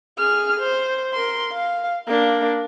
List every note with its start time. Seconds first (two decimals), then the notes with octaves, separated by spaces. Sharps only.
0.19 G#4 F6
0.61 C5
1.13 A#4 C6
1.53 F5
2.08 A#3 D4